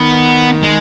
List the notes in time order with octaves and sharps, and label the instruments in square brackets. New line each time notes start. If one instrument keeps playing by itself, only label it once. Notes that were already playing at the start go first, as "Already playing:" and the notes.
Already playing: [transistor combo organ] D#3 [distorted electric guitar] B3
[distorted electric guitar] G#3